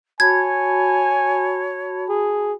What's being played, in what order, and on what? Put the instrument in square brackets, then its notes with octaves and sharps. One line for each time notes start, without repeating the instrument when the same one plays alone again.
[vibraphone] F#4 A5 B5 [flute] C#5 [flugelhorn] G#5 [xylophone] G#6
[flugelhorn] G#4